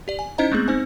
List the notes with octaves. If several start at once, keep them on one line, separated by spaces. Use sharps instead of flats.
G4 D5
G#5
C#4 D#4 E4 C5 D#5 A#5
G#3 A3 B3 C4 G#4
C4 D#4 C5 G#5